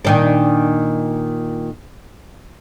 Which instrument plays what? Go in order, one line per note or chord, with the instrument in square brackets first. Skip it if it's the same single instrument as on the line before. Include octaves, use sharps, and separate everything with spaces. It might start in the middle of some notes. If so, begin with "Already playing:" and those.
[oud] A#2 D#3 D4